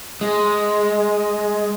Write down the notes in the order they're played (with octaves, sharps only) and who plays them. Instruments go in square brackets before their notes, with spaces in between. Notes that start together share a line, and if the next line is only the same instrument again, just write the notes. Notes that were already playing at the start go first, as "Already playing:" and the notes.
[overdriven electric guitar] G#3